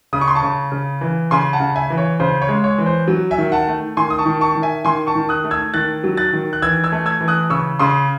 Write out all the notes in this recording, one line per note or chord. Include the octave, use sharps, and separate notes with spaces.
C#3 D#6
C#6
C6
A5 C#6
C#3
C#3
E3
C#3 G#5 C6
F#5 A5
C#3
E5 G#5
E3
C#5
C#3 C5
C#5
G#3
C#5
E3
C5
F#3
E5 G#5
D#3
F#5 A5
A3
D#3 G#5 C6
D#6
A5 C#6
D#3
A5 C#6
D#3
E5 G#5
D#3 G#5 C6
A5 C#6
D#3
D#6 F#6
A3
E6 G#6
D#3 F#6 A6
F#3
F#6 A6
D#3
F#6
E3 E6 G#6
E6 G#6
A3
E6 G#6
E3
D#6 F#6
C#3 C#6 E6
C#3 C6 D#6